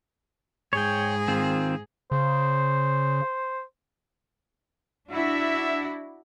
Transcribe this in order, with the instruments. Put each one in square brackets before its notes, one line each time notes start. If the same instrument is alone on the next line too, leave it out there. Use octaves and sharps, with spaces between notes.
[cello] G#2 G#4 [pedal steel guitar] C#5 G5
[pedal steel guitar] D#3 C4 F4
[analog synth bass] C#3 [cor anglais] C5
[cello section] D4 E4 F#4 [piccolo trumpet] E5